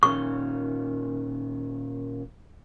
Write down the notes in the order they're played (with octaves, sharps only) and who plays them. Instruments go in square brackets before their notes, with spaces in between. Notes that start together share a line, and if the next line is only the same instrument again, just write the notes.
[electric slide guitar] A#2 D#3 C#4 [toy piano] C#6